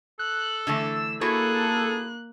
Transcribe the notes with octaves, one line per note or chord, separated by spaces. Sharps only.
A4 F#6
D3 E3 A3 E6
A#3 E4 F#4 G#4 A4 C#5 F#6